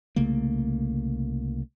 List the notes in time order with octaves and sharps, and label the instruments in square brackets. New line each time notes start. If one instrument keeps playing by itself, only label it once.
[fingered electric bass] C2 C#3 A3 A#3